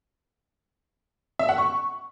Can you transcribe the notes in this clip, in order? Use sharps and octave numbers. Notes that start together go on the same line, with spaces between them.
E5
F#5
C#6